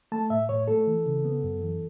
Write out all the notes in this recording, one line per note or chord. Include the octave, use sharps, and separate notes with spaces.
A3 A5
A2 E5
A2 C#5
A3 A4
E3
C#3
B3
F#2
E3